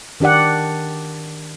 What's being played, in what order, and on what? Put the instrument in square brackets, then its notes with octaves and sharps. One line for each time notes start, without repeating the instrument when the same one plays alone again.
[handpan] D#3 D4 G4 D5 F#5